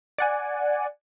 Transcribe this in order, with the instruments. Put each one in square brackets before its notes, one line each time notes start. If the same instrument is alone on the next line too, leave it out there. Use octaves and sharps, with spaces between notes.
[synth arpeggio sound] D5 F#5 G#5